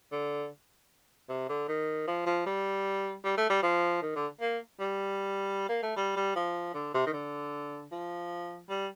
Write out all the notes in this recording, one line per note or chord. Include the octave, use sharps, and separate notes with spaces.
D3
C3
D3
D#3
F3
F3
G3
G3
A3
G3
F3
D#3
D3
A#3
G3
A#3
A3
G3
G3
F3
D3
C3
D#3
D3
F3
G3